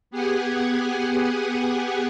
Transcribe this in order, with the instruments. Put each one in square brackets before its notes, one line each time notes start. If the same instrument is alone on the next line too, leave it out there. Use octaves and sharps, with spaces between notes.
[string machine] B3 G4 G#4 F#5 G#5